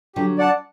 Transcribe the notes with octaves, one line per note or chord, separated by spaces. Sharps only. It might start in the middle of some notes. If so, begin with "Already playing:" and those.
D3 F#3 G4
D5 F#5 A5